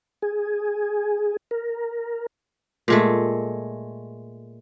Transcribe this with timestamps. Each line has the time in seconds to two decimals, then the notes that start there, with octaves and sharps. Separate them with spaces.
0.22 G#4
1.51 A#4
2.88 A#2 G#3 A3